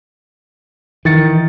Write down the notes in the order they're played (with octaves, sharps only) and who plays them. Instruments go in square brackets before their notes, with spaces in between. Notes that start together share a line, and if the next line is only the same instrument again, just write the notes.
[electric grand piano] D#3 A6 C#7 [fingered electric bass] E3